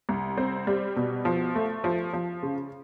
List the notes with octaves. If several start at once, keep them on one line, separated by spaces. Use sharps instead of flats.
C2
C4
G3
B2
F3
A3
F3
F3
C#3